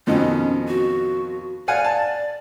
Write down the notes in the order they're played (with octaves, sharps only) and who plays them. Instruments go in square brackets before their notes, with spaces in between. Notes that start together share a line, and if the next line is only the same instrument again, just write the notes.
[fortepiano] F2 B2 D#3 [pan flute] C#4
[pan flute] F#4
[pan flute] D5 [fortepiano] F5 F#5 G#5
[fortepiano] A5